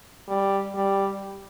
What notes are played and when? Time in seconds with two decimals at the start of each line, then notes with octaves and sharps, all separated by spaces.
0.28 G3
0.74 G3